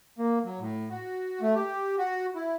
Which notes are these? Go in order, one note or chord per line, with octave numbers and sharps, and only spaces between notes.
A#3
F#3
A2
F#4
A3
G4
F#4
E4